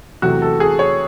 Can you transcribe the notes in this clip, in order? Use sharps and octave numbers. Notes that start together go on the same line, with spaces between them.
E2 C3 F#3 A3 F#4
A4
G#4
C#5